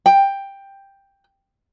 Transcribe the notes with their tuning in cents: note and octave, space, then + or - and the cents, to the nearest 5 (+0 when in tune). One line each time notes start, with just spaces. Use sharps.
G5 +10